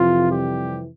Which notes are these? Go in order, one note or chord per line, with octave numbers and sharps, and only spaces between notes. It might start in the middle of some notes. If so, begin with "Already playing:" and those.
Already playing: F2 C3 E3 F3 F4
G3 G4